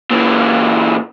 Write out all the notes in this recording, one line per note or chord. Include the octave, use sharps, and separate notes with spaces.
A#2 E3